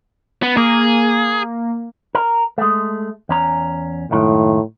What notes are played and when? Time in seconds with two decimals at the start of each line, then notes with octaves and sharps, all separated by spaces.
0.43 B3
0.57 A#3 G#4
2.15 A#4
2.58 G#3 A3
3.29 E2 C#4 A#5
4.11 C#2 F#2 A2 D#3